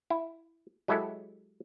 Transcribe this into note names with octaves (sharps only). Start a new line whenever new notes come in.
E4
F#3 G#3 E4 G4 A4